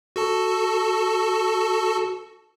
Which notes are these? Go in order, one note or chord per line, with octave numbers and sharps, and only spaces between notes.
F#4 A4 A5